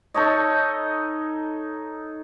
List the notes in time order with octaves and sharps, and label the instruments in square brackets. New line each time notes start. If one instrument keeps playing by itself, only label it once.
[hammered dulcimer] D#4 A4 C#5 D#5